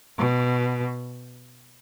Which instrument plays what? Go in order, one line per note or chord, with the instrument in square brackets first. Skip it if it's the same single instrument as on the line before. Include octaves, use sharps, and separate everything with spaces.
[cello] B2